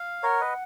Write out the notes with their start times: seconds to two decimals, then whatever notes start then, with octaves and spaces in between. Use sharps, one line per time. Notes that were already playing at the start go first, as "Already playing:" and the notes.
Already playing: F5
0.23 A#4 C#5 F#5
0.41 B4 D#5